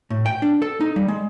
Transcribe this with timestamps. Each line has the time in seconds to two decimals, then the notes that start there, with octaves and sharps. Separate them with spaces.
0.10 A2
0.26 G5
0.42 D4
0.62 A4
0.81 D#4
0.96 G3
1.08 G#3